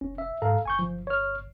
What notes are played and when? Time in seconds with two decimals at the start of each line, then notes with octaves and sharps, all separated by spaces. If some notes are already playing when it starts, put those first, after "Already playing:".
0.01 F1 C#4
0.18 E5
0.42 G#2 A4 F5 A#5
0.65 G1 G#5 C#6 G6
0.79 F3
1.07 C#5 F6